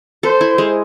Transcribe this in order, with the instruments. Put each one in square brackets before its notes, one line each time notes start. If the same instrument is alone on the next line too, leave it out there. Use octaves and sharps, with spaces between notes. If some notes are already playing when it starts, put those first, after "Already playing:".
[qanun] A4 [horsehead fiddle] C5
[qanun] E4
G#3